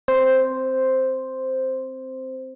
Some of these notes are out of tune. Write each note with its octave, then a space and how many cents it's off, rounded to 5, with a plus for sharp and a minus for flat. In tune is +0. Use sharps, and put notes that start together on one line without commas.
C4 +0 C5 +0